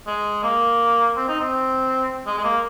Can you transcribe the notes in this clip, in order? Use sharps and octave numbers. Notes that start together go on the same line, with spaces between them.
G#3
A#3
C4
D#4
C4
G#3
G#3
A#3